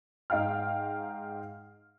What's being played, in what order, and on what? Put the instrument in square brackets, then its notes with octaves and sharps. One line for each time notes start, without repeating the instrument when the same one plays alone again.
[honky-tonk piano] G#2 D#4 F5 G5 F6